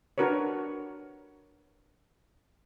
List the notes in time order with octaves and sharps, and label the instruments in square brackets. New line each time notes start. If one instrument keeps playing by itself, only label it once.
[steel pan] D4 F#4 A#4 B4 C#5